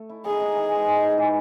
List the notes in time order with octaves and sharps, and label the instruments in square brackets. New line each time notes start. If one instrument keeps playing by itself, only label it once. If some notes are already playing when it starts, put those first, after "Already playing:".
Already playing: [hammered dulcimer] A3 A4
E4
[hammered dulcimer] D#4 [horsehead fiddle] G#4
[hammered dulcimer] D#4
E3
G#3
G#2
G#2
E3